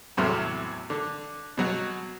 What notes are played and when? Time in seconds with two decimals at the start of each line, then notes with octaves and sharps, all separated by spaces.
0.17 E2 A2 C3 F#3 C6 F6
0.90 D3
1.57 B2 F#3 F#4